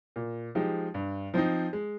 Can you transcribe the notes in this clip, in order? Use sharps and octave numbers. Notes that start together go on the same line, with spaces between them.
A#2
F3 G#3 D#4 G4
G2
F3 C4 D#4
G#3